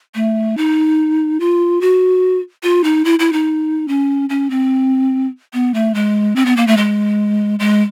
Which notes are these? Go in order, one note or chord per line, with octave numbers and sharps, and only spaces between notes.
A3
D#4
F4
F#4
F4
D#4
E4
E4
D#4
C#4
C#4
C4
B3
A3
G#3
C4
B3
A#3
A3
G#3
G#3